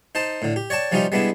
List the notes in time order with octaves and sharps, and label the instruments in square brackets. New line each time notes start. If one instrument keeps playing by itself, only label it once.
[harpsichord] D#4 C5 A5
A2 D3
G4
C#5 D5 G5 A5
F3 G3 C#4 D#4 F4 G4
G3 G#3 B3 D4 E4